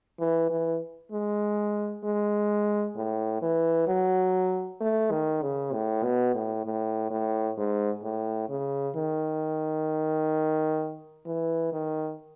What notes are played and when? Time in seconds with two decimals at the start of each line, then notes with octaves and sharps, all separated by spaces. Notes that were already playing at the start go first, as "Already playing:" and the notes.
0.20 E3
0.50 E3
1.12 G#3
2.04 G#3
2.96 A2
3.42 E3
3.88 F#3
4.80 A3
5.11 D#3
5.42 C#3
5.73 A2
6.03 B2
6.35 A2
6.65 A2
7.10 A2
7.58 G#2
8.03 A2
8.49 C#3
8.96 D#3
11.26 E3
11.72 D#3